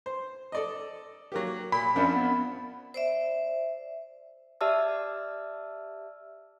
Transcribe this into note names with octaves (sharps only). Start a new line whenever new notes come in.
C5
A4 D5 D#5
F#3 A#3 G4
A#2 B5
F#2 F3 C4 D4
B3
C5 D5 E5
G4 D5 E5 A5 E6 F6